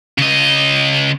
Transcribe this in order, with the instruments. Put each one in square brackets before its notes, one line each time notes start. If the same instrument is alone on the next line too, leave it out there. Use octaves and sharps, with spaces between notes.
[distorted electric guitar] C#3 D#5